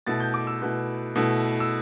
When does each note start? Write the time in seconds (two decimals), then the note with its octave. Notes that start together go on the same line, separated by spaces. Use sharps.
0.07 B2 A3 E4 A6
0.20 G6
0.34 D6
0.47 E6
0.62 B2 A3 E4
1.16 B2 A3 E4
1.60 E6